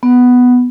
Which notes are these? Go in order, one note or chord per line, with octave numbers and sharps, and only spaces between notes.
B3